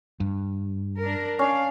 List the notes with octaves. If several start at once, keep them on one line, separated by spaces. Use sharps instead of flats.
G2
D4 A#4
C#4 D4 F5